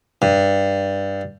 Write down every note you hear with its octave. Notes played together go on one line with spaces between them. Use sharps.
G2